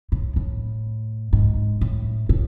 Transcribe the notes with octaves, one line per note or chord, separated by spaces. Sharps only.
A2
A2
G#2
A2
A2